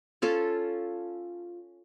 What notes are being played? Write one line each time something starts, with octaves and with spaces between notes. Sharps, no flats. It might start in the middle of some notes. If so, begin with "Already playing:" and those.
C#4 F4 A4